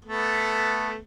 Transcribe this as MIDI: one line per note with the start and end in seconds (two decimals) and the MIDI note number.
0.05 0.99 57
0.05 0.99 59
0.05 0.99 69